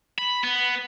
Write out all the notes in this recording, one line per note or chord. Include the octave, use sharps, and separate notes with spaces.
B5
B3